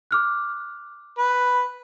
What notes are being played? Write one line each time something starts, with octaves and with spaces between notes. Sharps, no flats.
D6 F6 F#6
B4